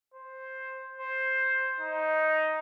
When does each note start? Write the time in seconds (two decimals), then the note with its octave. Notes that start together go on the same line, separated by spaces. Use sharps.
0.14 C5
0.97 C5
1.81 D#4